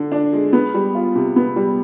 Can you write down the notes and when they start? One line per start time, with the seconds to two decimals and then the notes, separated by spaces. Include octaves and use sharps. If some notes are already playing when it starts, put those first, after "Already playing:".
Already playing: D3
0.12 D4
0.33 G#3
0.53 B3
0.74 G3
0.95 F4
1.15 C3
1.36 B3
1.56 G3